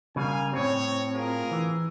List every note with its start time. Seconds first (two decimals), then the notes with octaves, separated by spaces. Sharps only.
0.16 C#3 G3 A#3 F5 G#5
0.53 A2 C4 C#5
1.14 F4 G#4 A#4
1.51 E3